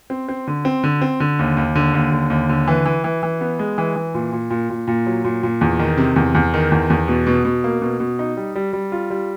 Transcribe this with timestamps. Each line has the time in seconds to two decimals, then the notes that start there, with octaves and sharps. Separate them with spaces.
0.10 C4
0.28 C4
0.47 D3
0.65 C4
0.84 D3
1.01 C4
1.20 D3
1.39 D#2
1.57 D#2
1.75 D3
1.94 D#2
2.12 D3
2.30 D#2
2.49 D3
2.68 E3
2.86 E3
3.04 E3
3.23 E3
3.41 B3
3.59 G#3
3.78 E3
3.96 E3
4.14 A#2
4.32 A#2
4.50 A#2
4.70 A#2
4.87 A#2
5.06 F#3
5.24 A#2
5.43 A#2
5.61 E2
5.79 D#3
5.98 C3
6.16 E2
6.35 E2
6.54 D#3
6.72 E2
6.90 E2
7.08 B2
7.27 B2
7.45 B2
7.64 A#3
7.82 B2
8.00 B2
8.19 D#4
8.37 G3
8.55 G3
8.73 G3
8.92 F4
9.10 G3